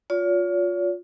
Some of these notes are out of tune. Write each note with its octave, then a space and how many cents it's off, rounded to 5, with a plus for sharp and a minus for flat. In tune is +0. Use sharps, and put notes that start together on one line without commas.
F4 +20 C#5 +45